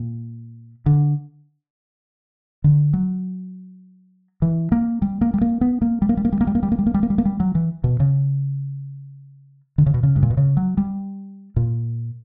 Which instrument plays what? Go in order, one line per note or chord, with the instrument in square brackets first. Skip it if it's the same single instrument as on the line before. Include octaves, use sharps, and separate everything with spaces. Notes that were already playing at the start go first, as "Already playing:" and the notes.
Already playing: [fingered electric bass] A#2
D3
D3
F#3
E3
A#3
G3
A#3
G3
A#3
B3
A#3
G3
A#3
G3
A#3
G3
A#3
G3
A#3
G3
A#3
G3
A#3
G3
A#3
G3
A#3
G3
F#3
E3
B2
C#3
D3
C#3
B2
C#3
G2
A#2
B2
C#3
F#3
G3
A#2